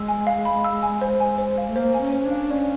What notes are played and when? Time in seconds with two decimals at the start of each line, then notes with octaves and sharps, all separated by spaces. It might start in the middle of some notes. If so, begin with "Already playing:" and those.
Already playing: G#3 E6
0.08 G#5
0.27 F5
0.45 B5
0.64 E6
0.83 G#5
1.01 C5
1.20 G#5
1.38 C5
1.58 F5
1.68 A3
1.76 A#3 C5
1.94 G#5
2.01 C#4
2.12 C5
2.25 D4
2.31 F5
2.50 C#4 D5